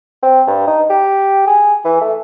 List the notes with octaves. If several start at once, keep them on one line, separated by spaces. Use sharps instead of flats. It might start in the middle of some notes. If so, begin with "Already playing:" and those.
C4
G2
D#4
G4
G#4
E3
A3